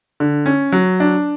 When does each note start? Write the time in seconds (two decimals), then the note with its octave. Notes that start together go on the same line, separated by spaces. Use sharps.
0.20 D3
0.46 C#4
0.72 F#3
1.00 D4